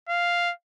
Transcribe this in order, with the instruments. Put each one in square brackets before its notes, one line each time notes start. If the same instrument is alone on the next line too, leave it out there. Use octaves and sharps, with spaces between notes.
[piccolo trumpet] F5